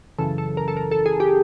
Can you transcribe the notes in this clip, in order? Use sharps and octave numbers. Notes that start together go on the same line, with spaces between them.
F#2 C#3 E3 A4
A4
A#4
A4
A#4
A4
G#4
G4